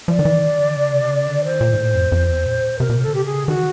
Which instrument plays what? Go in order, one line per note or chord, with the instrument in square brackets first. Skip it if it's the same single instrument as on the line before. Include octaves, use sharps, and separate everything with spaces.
[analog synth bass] F3 [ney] D5
[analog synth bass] D#3
E3
D#3
D3
C#3
C3
C#3
D3
[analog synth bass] D#3 [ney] C5
[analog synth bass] A#2
G#2
A2
F2
F2
E2
A#2
[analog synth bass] C3 [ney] A#4
[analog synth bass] B2
[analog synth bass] C3 [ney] A4
[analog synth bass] D3
[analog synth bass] C#3 [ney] G4
[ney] G#4
[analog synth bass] D#3 [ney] F#4